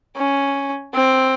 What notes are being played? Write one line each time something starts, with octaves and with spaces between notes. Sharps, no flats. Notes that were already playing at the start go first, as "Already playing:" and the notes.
C#4
C4